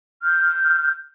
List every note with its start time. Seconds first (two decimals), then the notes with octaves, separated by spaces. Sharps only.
0.23 F6 G6